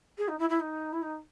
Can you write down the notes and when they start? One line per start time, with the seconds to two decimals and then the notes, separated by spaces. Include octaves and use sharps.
0.18 G#4
0.28 D#4
0.39 E4
0.49 E4
0.60 D#4
0.92 E4
1.02 D#4